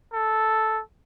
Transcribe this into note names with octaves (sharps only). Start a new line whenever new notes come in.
A4